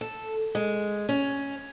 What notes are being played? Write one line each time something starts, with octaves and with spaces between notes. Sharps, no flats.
A4
G#3
C#4